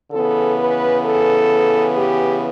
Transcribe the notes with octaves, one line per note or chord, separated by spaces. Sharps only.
C#3 E3 B3 A4
B4
A4
G4